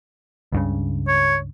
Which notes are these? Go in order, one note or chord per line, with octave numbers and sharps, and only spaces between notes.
C#2 G2 C#3
C#5